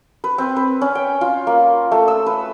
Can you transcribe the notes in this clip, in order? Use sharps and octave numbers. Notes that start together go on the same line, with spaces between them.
B4
C4
B4
C#4
G5
F4
A#3
A3
E6
B4